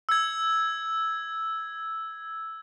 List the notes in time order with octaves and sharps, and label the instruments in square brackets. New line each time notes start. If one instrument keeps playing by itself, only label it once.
[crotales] E6 G#6